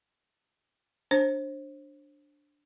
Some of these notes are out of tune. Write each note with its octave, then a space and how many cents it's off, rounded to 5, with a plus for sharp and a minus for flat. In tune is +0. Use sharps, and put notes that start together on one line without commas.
D4 +0 C5 +35